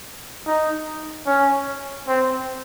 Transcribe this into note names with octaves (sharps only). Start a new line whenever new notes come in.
D#4
C#4
C4